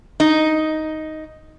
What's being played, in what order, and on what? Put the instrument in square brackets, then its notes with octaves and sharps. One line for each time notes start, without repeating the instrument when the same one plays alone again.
[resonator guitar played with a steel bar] D#4